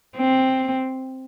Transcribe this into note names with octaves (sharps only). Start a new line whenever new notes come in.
C4